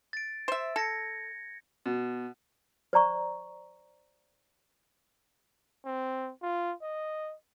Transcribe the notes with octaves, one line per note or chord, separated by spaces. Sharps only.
A6 D7
C5 E5
A4 G#6 A#6 C#7
B2
C5 D5 A#5 C#6
C4
F4
D#5